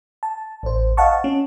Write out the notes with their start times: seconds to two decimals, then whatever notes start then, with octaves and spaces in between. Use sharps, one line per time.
0.23 A5
0.63 A1 C5
0.97 D#5 F5 F#5 A5 C#6
1.24 C#4